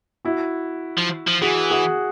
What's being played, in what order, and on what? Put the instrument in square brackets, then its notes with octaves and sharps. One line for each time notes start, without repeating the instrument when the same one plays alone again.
[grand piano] E4 F#4
[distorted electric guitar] F3
F3
[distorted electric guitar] E3 [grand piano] F#4 G#4
[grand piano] F#4 G#4